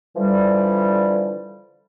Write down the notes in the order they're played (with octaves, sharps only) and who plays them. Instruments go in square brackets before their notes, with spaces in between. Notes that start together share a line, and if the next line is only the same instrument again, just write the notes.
[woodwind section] D3 E3 F3 G3